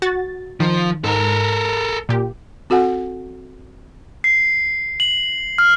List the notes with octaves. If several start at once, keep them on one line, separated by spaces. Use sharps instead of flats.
F#4 A6
D#3 F3
G#2 A4 A#4
A#2 G4
C4 F#4 A4 F#5 G#5
C7
F#7
F6